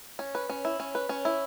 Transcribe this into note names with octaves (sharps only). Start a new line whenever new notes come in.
C#4
B4
C#4
E4
C#4
B4
C#4
E4